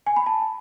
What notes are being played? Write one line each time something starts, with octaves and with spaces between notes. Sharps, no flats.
G#5
B5
A5